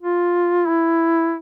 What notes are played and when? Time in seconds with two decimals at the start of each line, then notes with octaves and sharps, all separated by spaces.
0.01 F4
0.67 E4